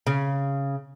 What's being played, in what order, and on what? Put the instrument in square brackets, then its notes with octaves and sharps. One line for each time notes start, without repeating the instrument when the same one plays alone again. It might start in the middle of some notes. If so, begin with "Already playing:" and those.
[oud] C#3